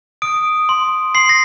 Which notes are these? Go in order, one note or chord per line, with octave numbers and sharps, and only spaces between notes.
D#6 D7
C6
C6 C7
A#6